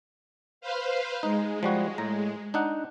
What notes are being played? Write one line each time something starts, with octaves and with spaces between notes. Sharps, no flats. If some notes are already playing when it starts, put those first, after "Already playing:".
B4 C5 F5
G#3 D#4
F3 G3 F#4
A2 A#5
D4 D#4 F#5